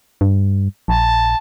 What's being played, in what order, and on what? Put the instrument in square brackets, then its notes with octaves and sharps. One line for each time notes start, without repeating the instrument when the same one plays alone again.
[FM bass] G2
[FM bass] A#1 [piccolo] A5